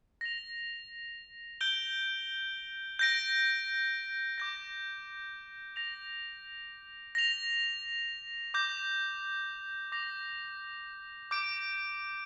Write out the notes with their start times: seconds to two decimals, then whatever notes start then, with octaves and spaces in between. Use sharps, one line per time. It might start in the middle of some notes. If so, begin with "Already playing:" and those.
0.21 A#6 F7
1.61 G6 D7 G7
2.99 G6 A#6 D7
4.38 D6 G6 A#6
5.76 A#6 F7
7.15 A#6 F7
8.54 D6 G6 A#6
9.92 D6 A#6 F7
11.31 D6 G6 D7